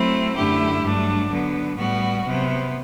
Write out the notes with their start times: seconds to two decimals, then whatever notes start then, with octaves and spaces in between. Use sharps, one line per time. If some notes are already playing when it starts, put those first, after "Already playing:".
Already playing: F#3 A3 C4 E4
0.37 F#2 D3 A3 E4 G4
0.83 G2 F#3 A3 D4
1.31 D3 F#3 B3
1.78 A2 G3 B3 F#4
2.25 C3 F#3 B3